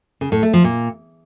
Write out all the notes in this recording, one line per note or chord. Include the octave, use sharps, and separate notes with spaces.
C#3
A2
A3
F3
A#2